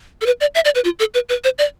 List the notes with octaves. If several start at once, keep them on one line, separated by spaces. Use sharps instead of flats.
A4
B4
D5
E5
D5
B4
F4
A4
B4
B4
C5
D5